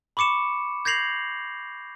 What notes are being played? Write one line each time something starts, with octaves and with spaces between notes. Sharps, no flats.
B5 C#6 D6 C#7 E7
G6 G#6 A#6 C7 F7 F#7